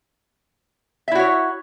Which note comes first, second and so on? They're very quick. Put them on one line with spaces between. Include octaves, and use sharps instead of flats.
E5 E4 F#4 C#5